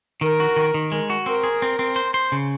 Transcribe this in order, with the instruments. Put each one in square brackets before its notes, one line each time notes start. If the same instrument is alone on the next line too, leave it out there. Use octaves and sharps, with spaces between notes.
[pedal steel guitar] D#3 [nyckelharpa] A#4
[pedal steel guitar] F#4
D#3
D#3
G#3
F#4
[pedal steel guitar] C4 [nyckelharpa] A#4
[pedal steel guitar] G#4
C4
C4
C5
C5
C#3